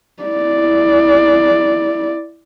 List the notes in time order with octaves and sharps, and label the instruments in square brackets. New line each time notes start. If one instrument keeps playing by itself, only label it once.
[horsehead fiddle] E4 D5